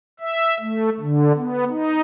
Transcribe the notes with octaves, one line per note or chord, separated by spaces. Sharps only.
E5
A3
D3
B3
D#4